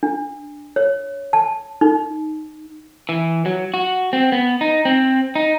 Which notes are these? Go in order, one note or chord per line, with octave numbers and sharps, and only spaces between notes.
D4
C#5
A5
D#4
E3
F#3
F#4
C4
B3
D#4
C4
D#4